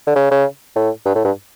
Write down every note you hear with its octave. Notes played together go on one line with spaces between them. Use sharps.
D3
C#3
C#3
A2
G2
A2
G2